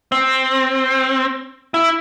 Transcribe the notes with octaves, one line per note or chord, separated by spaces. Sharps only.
C4
E4